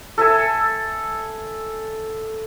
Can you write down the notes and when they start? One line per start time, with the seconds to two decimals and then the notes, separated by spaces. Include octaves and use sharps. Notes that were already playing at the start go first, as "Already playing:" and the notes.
0.18 A4 E5 G#5